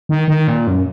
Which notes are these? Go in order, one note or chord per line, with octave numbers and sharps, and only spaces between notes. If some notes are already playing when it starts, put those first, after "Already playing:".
D#3
D#3
A#2
F#2